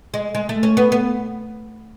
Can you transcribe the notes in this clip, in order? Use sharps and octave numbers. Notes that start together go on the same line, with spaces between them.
G#3
G#3
A3
C#4
B3
B3